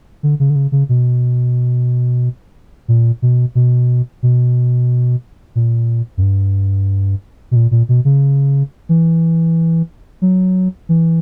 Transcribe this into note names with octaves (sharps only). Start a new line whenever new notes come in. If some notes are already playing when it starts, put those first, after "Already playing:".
D3
C#3
D3
C#3
C#3
B2
A#2
B2
B2
B2
A#2
F#2
G2
B2
A#2
A#2
B2
C#3
E3
F#3
E3